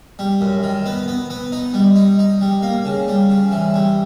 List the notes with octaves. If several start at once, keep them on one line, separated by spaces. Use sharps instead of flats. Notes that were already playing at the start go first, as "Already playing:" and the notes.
G3
F#2
D#3
B3
B3
B3
D#4
G3
D#4
D#4
G3
A#3
C#3
G3
C#3
E3
G3